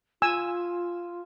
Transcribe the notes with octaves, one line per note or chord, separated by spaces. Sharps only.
F4 G#5 E6